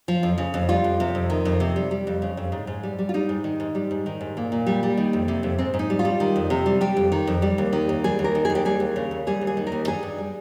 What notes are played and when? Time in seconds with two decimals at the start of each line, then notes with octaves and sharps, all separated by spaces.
0.08 F3
0.23 F2
0.38 C#3
0.54 F2
0.69 G3 F4
0.84 F2
1.00 C3
1.15 F2
1.30 D#3
1.45 F2
1.60 C3
1.76 G3
1.91 G3
2.07 F2
2.22 C#3
2.37 F2
2.52 G#2
2.67 G#2
2.83 G3
2.99 G3
3.09 F4
3.14 G3 D#4
3.29 G#2
3.44 D#3
3.60 G#2
3.75 G3
3.91 G#2
4.06 D#3
4.21 G#2
4.37 A#2 A#3
4.52 A#2
4.66 G3
4.83 G3
4.97 D#3
5.13 F2
5.28 C3
5.43 F2
5.58 G#2 C4
5.74 G#2
5.79 D#4
5.90 G3
5.99 F4
6.05 G3
6.20 D#3
6.36 F2
6.50 C3
6.66 G3
6.81 G3 G4
6.97 F2
7.12 D#3
7.27 F2
7.42 G3
7.58 D#2
7.73 D#3
7.89 D#2
8.04 G3 G#4
8.19 D#2
8.24 A#4
8.35 D#3
8.45 D#2 G#4
8.55 G4
8.65 G3 G#4
8.80 D#2
8.96 C#3
9.11 D#2
9.27 G3 G#4
9.41 D#2
9.47 G#4
9.57 D#3
9.67 A#4
9.72 D#2
9.87 G2 G#4
10.03 G2
10.18 G3